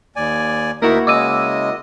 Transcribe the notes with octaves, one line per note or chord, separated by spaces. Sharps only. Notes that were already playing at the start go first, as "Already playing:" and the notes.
D#2 D5 G#5
D2 A#3 D#4 E4 F#4 A#4 E5
C#3 G#3 D#5 D6 E6 D#7